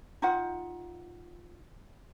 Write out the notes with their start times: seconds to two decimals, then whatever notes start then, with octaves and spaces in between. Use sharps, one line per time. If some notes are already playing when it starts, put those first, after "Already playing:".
0.22 D#4 F4 F#5